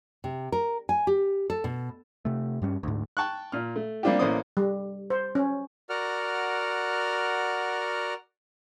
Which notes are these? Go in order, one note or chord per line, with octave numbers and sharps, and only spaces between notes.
C3
A#4
G#5
G4
A4
B2
C3 A3
G2 G3 B3 C#4
D2 G#2
G5 A5 C#6 F#6
A#2 F6
A3
G3 A#3 C4 D4 F4 G4
A1 A#3 C#4 C5 D5 D#6
G3
C5
C#4
F#4 A#4 D5 F#5 F6